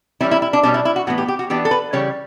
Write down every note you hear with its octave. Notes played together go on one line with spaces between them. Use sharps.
E3 G3 C#4 E4
E4
E4
D4
B2 G3 C#4 D4
E4
E4
F#4
A2 E3 B3 F#4
G4
G4
F#4
E3 B3 D4 G4
A4
B4
C#3 E3 G3 C#5